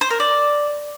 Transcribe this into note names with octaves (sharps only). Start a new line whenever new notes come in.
C5
A#4
D5